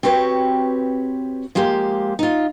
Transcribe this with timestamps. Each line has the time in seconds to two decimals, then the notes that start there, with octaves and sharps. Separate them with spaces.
0.03 C4 F#4 G4 B4 C#5
1.55 F3 G#3 A#3 G4
2.19 D#4 F4